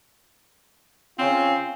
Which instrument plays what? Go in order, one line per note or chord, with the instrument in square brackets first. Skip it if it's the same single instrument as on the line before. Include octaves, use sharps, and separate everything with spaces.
[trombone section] C#3 C#4 F4 [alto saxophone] C4